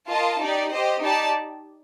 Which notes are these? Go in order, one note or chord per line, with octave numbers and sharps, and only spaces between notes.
F4 A#4 D#5 A5
D#4 G4 D5
G4 C5 D#5
D#4 G4 D5 A5